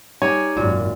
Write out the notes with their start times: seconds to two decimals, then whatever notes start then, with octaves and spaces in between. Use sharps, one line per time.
0.22 G3 D#4 C#5 G#5
0.57 G#1 F#2 A#2